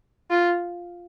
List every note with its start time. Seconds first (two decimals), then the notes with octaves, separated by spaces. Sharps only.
0.31 F4